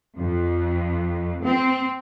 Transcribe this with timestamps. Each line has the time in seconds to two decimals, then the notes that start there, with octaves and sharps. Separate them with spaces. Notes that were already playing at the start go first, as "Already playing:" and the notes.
0.18 F2
1.43 C4